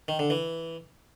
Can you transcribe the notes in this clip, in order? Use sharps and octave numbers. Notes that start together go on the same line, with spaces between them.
D#3
D3
E3